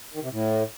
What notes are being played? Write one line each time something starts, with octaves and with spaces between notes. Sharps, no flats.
D#3
C3
A2